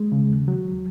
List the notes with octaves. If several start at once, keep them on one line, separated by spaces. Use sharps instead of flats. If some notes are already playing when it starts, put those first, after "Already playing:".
Already playing: G#3
C#3
D#2
F#3